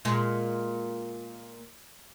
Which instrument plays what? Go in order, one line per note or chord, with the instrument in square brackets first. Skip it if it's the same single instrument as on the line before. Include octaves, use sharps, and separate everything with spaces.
[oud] A#2 G#3